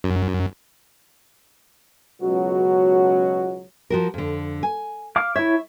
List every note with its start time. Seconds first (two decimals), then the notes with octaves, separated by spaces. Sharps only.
0.04 F#2
2.22 C#2 B2 F#3 F#4
3.90 F3 F#4 A#4
4.14 F2 D3
4.63 G#5
5.16 F5 D6
5.36 E4 C#5 E5